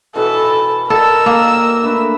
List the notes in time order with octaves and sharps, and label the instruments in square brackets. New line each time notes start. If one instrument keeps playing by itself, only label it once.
[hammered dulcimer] B2 E3 B5 [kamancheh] A4
[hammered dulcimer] G4 D5 D#5 [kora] A4 [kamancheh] A#4 E6
[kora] A#3
[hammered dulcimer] A3 D4 B4